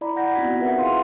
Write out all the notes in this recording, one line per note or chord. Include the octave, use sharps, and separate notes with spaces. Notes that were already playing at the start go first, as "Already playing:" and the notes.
E4 D5 A#5 B5
E4 F#5 G6 A#6
B3 C4 D#4 F#4 G#6 B6
F4 G#4 A#4 B4 E5 F#5
E4 G#4 F5 C6